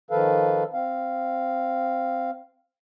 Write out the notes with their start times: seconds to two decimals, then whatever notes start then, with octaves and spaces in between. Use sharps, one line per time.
0.11 D#3 F3 A4 B4 F5
0.73 C4 F5